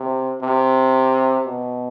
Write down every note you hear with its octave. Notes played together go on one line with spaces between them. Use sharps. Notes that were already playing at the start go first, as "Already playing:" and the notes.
Already playing: C3
C3
B2